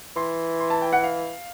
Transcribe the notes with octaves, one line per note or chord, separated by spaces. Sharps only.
E3 C6
C6
A5
G5
F#5
F5